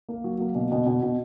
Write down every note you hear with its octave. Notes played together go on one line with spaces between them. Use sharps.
A#3
F#3
A#3
B2
B2
B2
B2